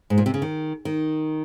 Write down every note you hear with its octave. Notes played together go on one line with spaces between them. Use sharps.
G#2
A#2
C3
C#3
D#3
D#3